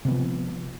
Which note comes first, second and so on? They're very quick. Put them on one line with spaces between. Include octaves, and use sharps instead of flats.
C3 B3 F3